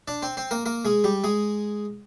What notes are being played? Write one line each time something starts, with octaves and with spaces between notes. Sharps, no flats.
D4 D5
C4 C5
C4 C5
A#3 A#4
A#3 A#4
G#3 G#4
G3 G4
G#3 G#4